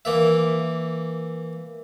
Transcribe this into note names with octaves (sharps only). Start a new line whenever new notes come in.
E3 A#3 E5